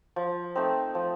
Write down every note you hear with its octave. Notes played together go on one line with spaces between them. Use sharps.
F3
A3 C4 D#4
F3